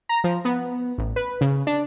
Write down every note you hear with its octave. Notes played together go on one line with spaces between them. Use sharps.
A#5
F3
B3
A1
B4
C#3
D4